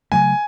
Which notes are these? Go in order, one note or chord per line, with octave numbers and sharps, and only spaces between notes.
C#3 F#3 A3 G#5